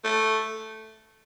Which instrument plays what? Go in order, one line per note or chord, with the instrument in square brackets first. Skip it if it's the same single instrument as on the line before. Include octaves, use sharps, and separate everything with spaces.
[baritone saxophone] A3